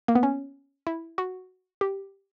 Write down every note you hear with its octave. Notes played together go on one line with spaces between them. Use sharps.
A#3
B3
C#4
E4
F#4
G4